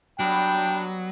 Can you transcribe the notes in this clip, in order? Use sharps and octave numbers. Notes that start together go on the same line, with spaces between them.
F#3 G3 B3 D4 G5